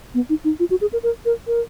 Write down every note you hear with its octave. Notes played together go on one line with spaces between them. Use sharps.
B3
D#4
D#4
F4
F#4
G#4
A#4
A#4
A#4
A#4